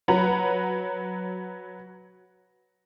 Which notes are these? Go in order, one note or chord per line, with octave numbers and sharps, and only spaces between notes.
F#3 B4 F#5 A#5